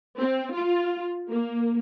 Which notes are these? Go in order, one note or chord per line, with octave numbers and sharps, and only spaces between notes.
C4
F4
A#3